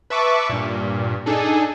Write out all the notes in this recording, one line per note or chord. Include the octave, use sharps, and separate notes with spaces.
B4 E5 A5 C#6 D6
G2 A#2
D4 D#4 G#4 A4